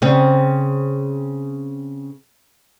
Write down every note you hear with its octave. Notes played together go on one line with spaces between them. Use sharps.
C#3 C4